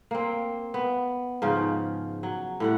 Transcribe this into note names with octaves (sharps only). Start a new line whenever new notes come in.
A#3 C4
B3
G#2 C#3 F3
F#3
A2 G3 F#5